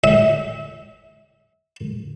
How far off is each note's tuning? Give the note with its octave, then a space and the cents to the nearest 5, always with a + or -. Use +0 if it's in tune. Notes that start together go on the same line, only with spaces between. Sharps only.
E5 -30